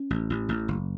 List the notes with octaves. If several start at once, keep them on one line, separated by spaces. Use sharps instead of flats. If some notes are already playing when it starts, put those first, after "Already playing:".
Already playing: C#4
A1
A1
A1
F#1